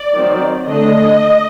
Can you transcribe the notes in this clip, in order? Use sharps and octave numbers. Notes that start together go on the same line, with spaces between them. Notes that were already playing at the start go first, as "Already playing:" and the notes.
Already playing: D5
D#3 F#3 C4
D3 A3 D4 D#5